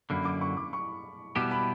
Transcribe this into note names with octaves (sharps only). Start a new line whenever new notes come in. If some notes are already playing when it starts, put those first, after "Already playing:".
F#2 D3 A#3 B5
D6
C#6
D6
C#6
B2 G3 B3 E4 G4 D6
B5